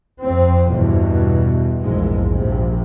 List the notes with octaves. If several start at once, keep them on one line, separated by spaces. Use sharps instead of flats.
F2 C4
E2 G2 B2
A#1 E2 G#2 G#3
A#1 C3